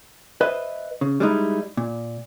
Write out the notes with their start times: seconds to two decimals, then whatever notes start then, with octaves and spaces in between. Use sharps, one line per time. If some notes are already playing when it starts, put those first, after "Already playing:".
0.41 B4 C5 D#5 E5
1.01 C#3
1.20 G3 G#3 D#4 E4
1.77 A#2